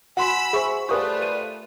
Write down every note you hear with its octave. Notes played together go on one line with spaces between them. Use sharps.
F#4 F#5 G#5 B5 C6 E6
G#4 C5 E5 G#5 C#6
A3 F4 G4 B4 C5 D5 C#6 D#6
D#7